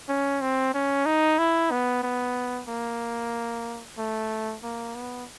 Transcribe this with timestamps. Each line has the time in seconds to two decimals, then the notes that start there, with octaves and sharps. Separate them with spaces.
0.09 C#4
0.41 C4
0.74 C#4
1.06 D#4
1.39 E4
1.71 B3
2.03 B3
2.68 A#3
3.98 A3
4.63 A#3
4.95 B3